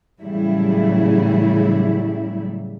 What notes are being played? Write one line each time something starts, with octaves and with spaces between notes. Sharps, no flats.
A2 C#3 E3 F#3 G3 E4